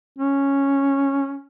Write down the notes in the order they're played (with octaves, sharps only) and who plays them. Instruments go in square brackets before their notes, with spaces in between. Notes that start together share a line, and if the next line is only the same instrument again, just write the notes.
[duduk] C#4